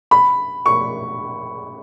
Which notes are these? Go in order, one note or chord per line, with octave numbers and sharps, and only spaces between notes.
B5
C#6